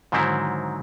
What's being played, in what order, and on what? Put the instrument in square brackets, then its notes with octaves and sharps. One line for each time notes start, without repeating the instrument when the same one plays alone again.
[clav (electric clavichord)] G#2 D3 D#3 F#3 C4 E4